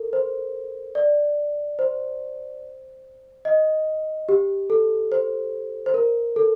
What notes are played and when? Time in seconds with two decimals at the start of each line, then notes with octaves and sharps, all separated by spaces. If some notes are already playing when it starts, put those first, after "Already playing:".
Already playing: A4 A#4
0.13 C5
0.95 D5
1.79 C5
3.45 D#5
4.29 G4
4.70 A4
5.12 C5
5.86 C5
5.94 A#4
6.36 A4